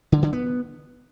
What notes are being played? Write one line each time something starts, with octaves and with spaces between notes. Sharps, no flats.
D3
D3
B3